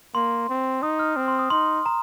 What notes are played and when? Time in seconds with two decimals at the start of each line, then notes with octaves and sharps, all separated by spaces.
0.15 A#3 C6
0.49 C4
0.82 D#4 D#6
0.99 F6
1.16 C4
1.28 C6
1.39 D#6
1.50 D#4 C6
1.86 A#5